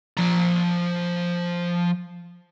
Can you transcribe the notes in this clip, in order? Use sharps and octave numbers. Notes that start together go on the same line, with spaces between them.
F3 A#5